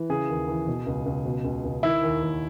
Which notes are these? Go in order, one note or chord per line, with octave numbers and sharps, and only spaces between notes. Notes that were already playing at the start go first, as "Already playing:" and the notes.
Already playing: E3
C#3 G#4
D#2
E3
B2
C#2
C#2
B2
C#2
C#2
D#3 E4
D#2
D#2